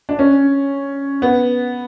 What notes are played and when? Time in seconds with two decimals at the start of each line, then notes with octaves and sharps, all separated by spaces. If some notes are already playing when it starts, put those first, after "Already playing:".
0.09 D4
0.19 C#4
1.22 B3